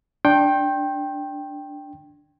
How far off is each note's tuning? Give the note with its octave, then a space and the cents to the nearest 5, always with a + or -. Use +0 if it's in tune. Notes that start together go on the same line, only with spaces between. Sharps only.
D4 +0 G5 +0 C6 +45